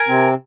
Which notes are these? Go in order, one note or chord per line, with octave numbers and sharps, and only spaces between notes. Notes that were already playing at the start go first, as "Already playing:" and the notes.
Already playing: A#4 G#5
C3 C4